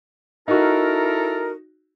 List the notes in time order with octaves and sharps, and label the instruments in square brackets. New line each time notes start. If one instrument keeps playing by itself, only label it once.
[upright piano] D#4 F#4 [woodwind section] E4 A4 A#4